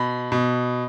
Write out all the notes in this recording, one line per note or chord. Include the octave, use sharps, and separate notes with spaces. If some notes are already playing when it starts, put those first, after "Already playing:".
Already playing: B2 B5
B2